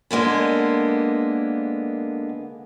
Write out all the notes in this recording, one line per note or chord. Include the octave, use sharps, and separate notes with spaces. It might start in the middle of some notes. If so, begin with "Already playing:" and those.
D3 G#3 A#3 B3